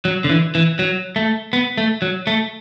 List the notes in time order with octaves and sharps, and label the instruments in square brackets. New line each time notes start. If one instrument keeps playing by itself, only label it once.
[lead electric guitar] F#3
D3
E3
E3
F#3
A3
B3
A3
F#3
A3